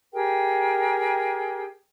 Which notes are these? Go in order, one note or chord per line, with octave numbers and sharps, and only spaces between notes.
G4 G#4 A#4 G5